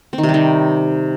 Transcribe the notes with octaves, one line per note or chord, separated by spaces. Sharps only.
C4
D#3
C3
G3
D#3